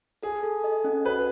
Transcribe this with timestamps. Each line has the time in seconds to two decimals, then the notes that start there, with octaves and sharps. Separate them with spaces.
0.23 G#4 A4
0.43 A4
0.64 D#5
0.84 C#4
1.05 F#4 B4